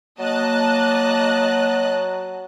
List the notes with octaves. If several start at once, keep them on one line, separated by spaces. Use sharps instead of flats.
F#3 A#3 D#5 A5 F#6